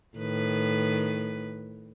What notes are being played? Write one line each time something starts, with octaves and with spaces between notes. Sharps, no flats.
A2 D#3 B4